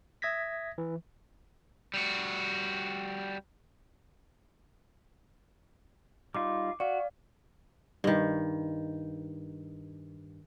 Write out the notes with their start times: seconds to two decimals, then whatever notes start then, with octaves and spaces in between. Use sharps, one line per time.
0.22 E5 D#6 G#6 A#6 B6
0.78 E3
1.94 G3 F#4
6.35 G3 D#4 F4 D6
6.80 F#4 D5 F5
8.04 G2 D#3